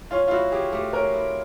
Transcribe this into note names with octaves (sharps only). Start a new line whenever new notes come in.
C#4 F4
F4
E4 F#4
G4 G#4
A3 G4
C#4 A#4
E4